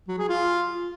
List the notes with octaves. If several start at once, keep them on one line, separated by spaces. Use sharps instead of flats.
F#3
G#4
F4